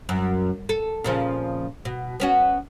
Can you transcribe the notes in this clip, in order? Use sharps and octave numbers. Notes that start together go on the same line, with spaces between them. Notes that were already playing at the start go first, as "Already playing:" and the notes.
F#2
A4
A#2 C#3 F3
B2
B3 C#4 F#4